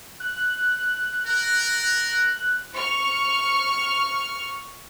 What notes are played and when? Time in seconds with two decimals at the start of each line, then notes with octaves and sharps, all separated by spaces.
0.20 F#6
1.26 A#4
2.74 C#6 F6